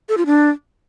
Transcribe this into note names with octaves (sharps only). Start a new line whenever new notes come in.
A4
F4
D4